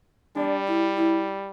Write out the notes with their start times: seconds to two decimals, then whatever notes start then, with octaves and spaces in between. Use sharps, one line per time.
0.36 G3 D4
0.67 E4
0.97 E4